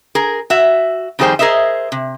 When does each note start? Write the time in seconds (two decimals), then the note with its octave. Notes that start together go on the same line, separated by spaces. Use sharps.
0.15 G#4 A#4
0.50 F#4 E5
1.19 F2 D#3 G3 G#4 C5 G5
1.39 G#4 A#4 C5 D#5 E5
1.92 C3